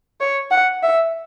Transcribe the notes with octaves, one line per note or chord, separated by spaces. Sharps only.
C#5
F#5
E5